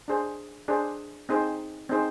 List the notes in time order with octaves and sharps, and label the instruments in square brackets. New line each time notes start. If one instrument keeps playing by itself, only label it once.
[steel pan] D4 G#4 C5
D4 G#4 C5
C4 D#4 G#4 C5
C4 D#4 G#4 C5